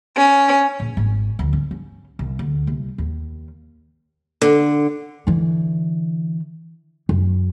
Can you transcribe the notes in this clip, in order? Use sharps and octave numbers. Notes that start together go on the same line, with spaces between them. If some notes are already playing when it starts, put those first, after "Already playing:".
C#4
A#1
G#1
D2
C#4
C#4
C2
D2
C2
D#2
D3
D3 E3
F#2